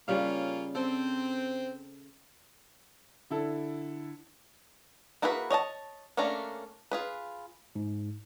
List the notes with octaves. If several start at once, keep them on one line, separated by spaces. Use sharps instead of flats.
C#3 G3 A#3 C#4 F4 F5
C4 A4
D3 E4 A4
A#3 E4 F#4 G#4 B4
C#5 D#5 G#5 A5
A3 A#3 C#4 D4 A#5
F4 G#4 B4
G#2